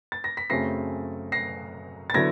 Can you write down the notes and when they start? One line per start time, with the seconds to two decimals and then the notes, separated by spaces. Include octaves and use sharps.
0.12 A6
0.24 A#6
0.37 B6
0.50 F#2 C#3 F#3 A3 C4 A#6 C7
1.32 A#6 C7
2.10 A6
2.14 D3 F#3 B3 E4 G#6 A#6